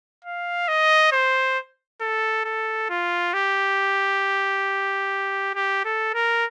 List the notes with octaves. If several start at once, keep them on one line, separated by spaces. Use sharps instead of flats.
F5
D#5
C5
A4
A4
F4
G4
G4
A4
A#4